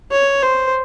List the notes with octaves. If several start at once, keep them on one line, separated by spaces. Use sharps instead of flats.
C#5
C5